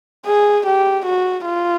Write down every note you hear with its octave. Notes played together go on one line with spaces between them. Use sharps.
G#4
G4
F#4
F4